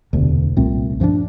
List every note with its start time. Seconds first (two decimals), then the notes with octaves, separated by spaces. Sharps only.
0.13 E1 D2 C3
0.57 C2 A#2 A3 C4
1.00 G2 F3 A#3 D4